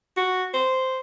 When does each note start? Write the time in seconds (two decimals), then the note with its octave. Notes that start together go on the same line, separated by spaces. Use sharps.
0.17 F#4
0.54 C5